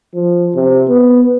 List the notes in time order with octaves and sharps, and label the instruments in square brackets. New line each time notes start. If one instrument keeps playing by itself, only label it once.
[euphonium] F3
C3
B3